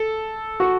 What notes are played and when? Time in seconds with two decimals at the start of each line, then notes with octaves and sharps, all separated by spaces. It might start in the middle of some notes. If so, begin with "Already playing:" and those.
Already playing: A4
0.60 F#4